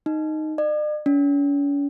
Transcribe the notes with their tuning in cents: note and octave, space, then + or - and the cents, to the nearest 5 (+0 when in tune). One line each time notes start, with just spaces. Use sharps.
D#4 -5
D5 +45
C#4 +40